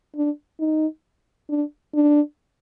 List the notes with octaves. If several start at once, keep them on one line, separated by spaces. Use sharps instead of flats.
D4
D#4
D4
D4